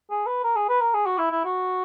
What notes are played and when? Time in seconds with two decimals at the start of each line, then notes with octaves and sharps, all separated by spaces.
0.10 G#4
0.26 B4
0.43 A#4
0.56 G#4
0.69 B4
0.81 A#4
0.94 G#4
1.06 F#4
1.18 E4
1.31 E4
1.44 F#4